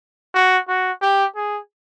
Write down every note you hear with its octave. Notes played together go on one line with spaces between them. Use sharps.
F#4
F#4
G4
G#4